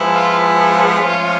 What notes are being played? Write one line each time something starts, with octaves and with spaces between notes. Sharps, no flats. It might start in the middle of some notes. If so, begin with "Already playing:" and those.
Already playing: G#2 F3 G#3 B3 E4
F4
F4
G#2 F3 A3 C#4